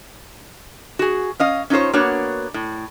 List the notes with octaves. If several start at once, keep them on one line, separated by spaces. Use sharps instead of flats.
F#4 G#4
C#4 D#5 F5
C#4 D#4 F4 C5 C#5
A#3 B3 D4 F#4 C#5
A2